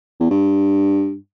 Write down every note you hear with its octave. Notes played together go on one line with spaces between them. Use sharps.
E2
G2